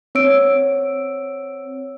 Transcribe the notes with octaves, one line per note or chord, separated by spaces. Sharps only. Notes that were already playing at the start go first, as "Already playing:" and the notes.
C4 C#5 E6 D7